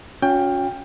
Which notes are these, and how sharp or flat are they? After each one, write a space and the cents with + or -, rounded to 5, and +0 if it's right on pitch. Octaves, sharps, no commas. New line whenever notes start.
C#4 +15 F#4 -35 G5 +20